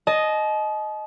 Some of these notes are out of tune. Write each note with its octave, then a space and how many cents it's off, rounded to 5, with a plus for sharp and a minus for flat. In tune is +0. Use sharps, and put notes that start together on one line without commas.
D#5 +0 A5 -40